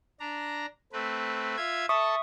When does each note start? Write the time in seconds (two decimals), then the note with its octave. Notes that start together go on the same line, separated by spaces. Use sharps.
0.20 D4 A#5
0.93 A3 C4 B4
1.57 F4 E5 G#6
1.89 A4 E5 A5 C#6 D#6